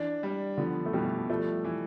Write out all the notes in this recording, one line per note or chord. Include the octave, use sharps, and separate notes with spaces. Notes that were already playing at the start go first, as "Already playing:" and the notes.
Already playing: E3 D4
G3
D3 F3 B3
A3
B2 E3 G3
F3 G3 A3
E3